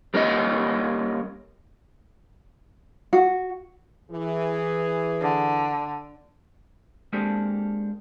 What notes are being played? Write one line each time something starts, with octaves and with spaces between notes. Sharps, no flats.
G3 A#3 C#4 G4 D#5
F#4
E3 G#4
D3
G#3 A#3 C4 D4 G4 A4